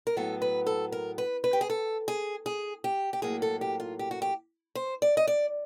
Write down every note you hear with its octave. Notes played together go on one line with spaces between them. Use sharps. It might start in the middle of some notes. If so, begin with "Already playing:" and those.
A#4
A2 F#3 B3 A4
B4
A4
A#4
B4
B4
G4
G#4
A4
G#4
G#4
G4
G4
A2 F#3 A#3 G#4
A4
G4
F4
G4
F#4
G4
C5
D5
D#5
D5